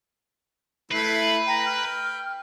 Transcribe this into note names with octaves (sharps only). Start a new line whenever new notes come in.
A3 E4 B4 C7
G5 A#5
F6